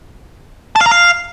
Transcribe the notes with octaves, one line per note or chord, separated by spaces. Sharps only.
A5
F5
A#5
F5